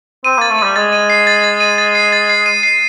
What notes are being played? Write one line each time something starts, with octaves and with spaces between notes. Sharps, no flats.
C4 D#7
A#3 A6
A3
G3 D#7
G#3 A6
D#7
C7
A6
A6
D#7
A6
C7
A6
C7
D#7
C7